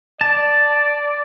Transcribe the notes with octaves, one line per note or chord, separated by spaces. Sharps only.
D5 A5